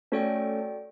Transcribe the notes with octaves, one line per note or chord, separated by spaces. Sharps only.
A3 C#4 F#4 A4 D5 G5